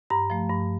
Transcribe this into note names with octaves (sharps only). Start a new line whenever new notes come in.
G2 A#5
F3 A3
G2